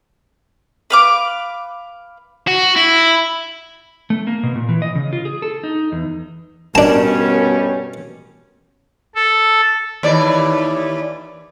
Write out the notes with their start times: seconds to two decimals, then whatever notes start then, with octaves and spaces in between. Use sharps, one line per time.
0.90 B4 F5 D6
2.47 F#4
2.76 E4
4.10 A3
4.27 A#3
4.43 B2
4.56 A#2
4.69 E3
4.82 D#5
4.95 C#3
5.13 F4
5.25 G#4
5.42 A4
5.64 D#4
5.92 E2
6.75 G2 B2 G3 C#4 D4 A#4 A5
9.15 A4
10.03 D#2 E3 D5